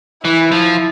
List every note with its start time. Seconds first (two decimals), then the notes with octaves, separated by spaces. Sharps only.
0.24 E3 E4
0.52 F3